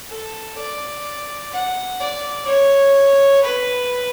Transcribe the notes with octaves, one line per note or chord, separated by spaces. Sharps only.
A4
D5
F#5
D5
C#5
B4